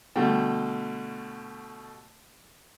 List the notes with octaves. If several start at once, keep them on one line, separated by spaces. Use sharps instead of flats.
B2 D3 G3 A3 G5